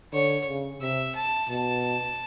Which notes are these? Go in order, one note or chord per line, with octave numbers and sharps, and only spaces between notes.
D3 C#5
C#3
C3 E5
A5
B2 A5